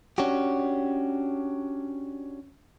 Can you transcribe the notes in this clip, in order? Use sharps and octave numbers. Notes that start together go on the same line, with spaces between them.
C#4 D4 F#4 G4